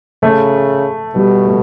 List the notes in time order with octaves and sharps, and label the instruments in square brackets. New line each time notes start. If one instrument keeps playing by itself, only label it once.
[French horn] C#3 [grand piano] A3
[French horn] B2 [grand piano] G3
[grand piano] A3